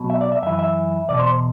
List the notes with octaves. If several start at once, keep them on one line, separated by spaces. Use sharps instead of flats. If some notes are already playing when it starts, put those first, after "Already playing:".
Already playing: B1 B2
E5
D5
E5
F#2 E3 E5
E5
E2 B2 D5
C5